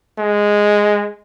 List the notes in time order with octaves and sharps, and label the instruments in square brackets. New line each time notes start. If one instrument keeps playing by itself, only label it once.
[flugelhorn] G#3